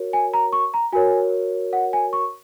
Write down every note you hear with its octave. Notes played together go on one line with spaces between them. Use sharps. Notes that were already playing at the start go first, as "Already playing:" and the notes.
Already playing: F#4 A#4 C#5
G#5
A#5
C#6
A#5
F#4 A#4 C#5 G#5
F#5
G#5
C#6